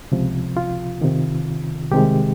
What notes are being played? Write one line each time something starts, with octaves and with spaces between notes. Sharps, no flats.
C#2 C3 F3
F4
F2 C3 D#3
C2 C3 D#3 G#3 G4